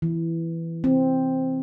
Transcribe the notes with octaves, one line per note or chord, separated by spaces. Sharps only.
E3
C4